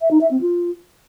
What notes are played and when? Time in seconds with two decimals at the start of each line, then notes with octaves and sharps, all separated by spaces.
0.01 E5
0.11 D#4
0.21 E5
0.31 C4
0.41 F4